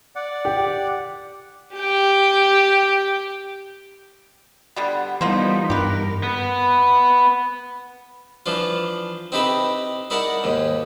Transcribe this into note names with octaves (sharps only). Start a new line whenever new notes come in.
D5 F#5
G4
G4 G5
D3 G3 B3
E3 F3 G3 A#3 B3 D#4 C5
G2 G4 A#4 B4
B3
E3 F3 D4 F4
C4 D#4 E4 G4 A4 B4
D#4 E4 A#4 D5 F#5 A5
D#2 G#2